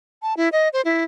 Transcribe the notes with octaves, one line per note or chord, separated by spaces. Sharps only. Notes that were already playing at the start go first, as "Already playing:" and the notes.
A5
E4
D#5
C5
E4